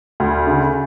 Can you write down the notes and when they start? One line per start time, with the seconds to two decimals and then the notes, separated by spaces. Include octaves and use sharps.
0.20 D2
0.47 C#3